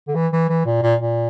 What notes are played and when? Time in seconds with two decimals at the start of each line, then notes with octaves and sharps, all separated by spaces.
0.08 D3
0.15 E3
0.32 E3
0.49 E3
0.66 A#2
0.83 A#2
1.00 A#2